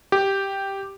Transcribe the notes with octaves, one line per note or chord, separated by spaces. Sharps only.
G4